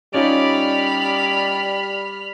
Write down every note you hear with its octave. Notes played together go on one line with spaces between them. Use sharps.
G3 C#4 D#4 F4 D5 B5 F6